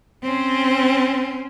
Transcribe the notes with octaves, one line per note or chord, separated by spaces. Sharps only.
C4 C#4